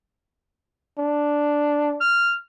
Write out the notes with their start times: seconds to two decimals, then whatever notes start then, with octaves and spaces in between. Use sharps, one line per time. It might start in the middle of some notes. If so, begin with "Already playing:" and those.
0.98 D4
2.01 F6